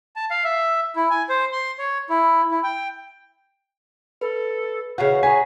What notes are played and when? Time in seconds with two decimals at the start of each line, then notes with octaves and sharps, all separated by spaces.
0.16 A5
0.30 F5
0.44 E5
0.96 E4
1.10 G#5
1.29 C5
1.52 C6
1.79 C#5
2.09 E4
2.51 E4
2.63 G5
4.21 A4 B4
4.98 C#3 E3 F#4 F5 F#5
5.23 G#4 C#5 G#5 A#5 B6